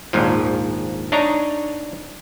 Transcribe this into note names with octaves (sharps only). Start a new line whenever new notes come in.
A#1 D#2 G#2 F3
D4 D#4 C#5 D#5 A#5